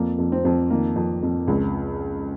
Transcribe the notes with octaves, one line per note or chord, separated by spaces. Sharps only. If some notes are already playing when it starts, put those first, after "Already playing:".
Already playing: F2 A#3
F2
C4
F2
D#3 A#3
F2
F2
C#2